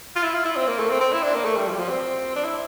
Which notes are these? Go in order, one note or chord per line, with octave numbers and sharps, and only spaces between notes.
F4
E4
F4
E4
C4
A#3
A3
C4
C4
E4
D4
A#3
A3
G3
F3
G3
F3
C4
D4
E4